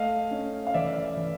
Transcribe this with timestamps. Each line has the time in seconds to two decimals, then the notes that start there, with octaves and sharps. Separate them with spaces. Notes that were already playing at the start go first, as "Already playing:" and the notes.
Already playing: A3 D#5 F5
0.31 C#4
0.67 F5
0.74 E3 D5 E5
1.17 E3